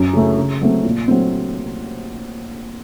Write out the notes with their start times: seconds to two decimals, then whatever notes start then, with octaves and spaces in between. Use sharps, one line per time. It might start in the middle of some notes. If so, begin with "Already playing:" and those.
Already playing: F#2
0.13 C#3 A3
0.37 C#3
0.61 F#3 A3 C4
0.84 A#2
1.08 F#3 A3 C4